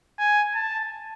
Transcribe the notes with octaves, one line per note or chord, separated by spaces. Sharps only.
G#5
A5